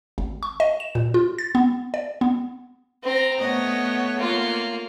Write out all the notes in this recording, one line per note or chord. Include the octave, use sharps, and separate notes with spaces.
G#1
C#6
D#5
E7
A#2
F4
A6
B3
D5
B3
C4 A#5
A3 B3 C#5 D#5
A#3 F4